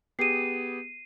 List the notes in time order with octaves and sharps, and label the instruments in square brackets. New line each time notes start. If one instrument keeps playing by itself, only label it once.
[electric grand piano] B3 G4 G#4 [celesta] C7 D#7